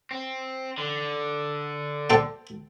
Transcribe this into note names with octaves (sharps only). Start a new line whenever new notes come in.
C4
D3
A4 C5 G5